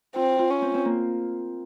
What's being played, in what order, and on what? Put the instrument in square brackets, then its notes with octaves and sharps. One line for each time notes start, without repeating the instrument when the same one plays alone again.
[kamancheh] C4 [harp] F4
[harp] F4
[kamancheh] C#4
[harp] C4
C4
A#3